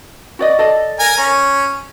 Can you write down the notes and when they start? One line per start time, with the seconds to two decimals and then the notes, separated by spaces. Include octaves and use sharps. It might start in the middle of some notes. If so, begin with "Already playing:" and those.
0.39 F#4 D5 D#5
0.59 A4 D5 D#5
0.99 A#4 G#5
1.18 C#4